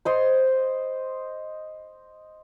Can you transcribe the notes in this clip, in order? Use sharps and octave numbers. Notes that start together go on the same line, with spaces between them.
C5 D#5 C6